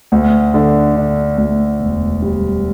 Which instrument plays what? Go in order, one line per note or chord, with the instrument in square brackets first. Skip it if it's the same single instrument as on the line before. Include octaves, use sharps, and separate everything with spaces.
[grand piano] D2
D3
D3
D2
E1
G3